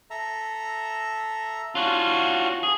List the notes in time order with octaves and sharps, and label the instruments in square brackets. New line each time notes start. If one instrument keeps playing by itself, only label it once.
[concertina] A4 E5 A#5
[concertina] C#4 D4 F#5 [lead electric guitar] F4 F#4
[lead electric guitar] G#4